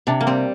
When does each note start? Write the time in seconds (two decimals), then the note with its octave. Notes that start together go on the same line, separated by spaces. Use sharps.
0.07 C3 D4
0.21 A#3
0.27 G3 C4